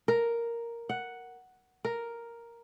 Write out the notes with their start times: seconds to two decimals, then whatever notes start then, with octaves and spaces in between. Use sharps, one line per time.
0.08 A#4
0.89 F#5
1.85 A#4